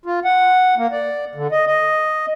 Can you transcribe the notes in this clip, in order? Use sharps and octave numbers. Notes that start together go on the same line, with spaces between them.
F4
F#5
A#3
D5
D3
D#5
D#5